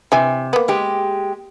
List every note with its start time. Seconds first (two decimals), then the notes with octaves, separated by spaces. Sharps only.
0.12 C3 E3 G#5
0.53 A#3 B3
0.68 G#3 G4